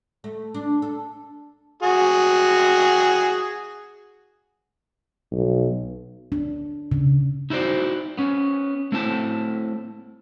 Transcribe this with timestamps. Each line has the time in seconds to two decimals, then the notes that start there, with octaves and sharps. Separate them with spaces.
0.24 A3
0.54 D4
0.82 A4
1.83 F#4 G#4
5.32 B1
6.32 D4
6.92 C#3
7.50 D#4 E4 F#4 C5 D5
8.18 B3 C#4
8.92 A3 C4 E4 A5